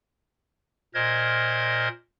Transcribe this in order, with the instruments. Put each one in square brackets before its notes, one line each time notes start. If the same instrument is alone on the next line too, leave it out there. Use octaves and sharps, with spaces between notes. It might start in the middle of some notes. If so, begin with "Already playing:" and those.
[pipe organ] A#2 A#4 C5 D#5 G#6